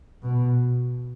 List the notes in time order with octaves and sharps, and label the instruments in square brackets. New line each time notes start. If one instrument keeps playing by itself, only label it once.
[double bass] B2